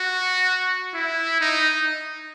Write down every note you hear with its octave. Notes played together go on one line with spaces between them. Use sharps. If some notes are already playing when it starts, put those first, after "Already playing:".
Already playing: F#4
E4
D#4